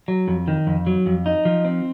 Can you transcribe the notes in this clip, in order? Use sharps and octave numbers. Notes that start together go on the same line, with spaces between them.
F#3
F2
D#3
F2
F#3
F2
D#4
F3
C4